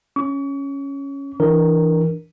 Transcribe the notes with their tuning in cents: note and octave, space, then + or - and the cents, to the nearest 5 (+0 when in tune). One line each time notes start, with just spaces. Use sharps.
C#4 +0 C#6 +40
E3 +0 D4 +10 A#4 +0